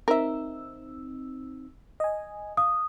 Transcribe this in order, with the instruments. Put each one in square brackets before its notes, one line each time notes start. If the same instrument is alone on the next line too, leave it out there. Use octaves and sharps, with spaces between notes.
[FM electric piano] C4 D#4 E6 [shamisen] A#4 E5
[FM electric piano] D#5 G#5
[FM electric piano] F5 [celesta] D#6